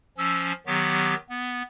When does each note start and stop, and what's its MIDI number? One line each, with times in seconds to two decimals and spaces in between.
0.17 0.52 53
0.17 0.52 61
0.17 0.52 88
0.66 1.14 51
0.66 1.14 54
0.66 1.14 59
0.66 1.14 67
1.29 1.62 59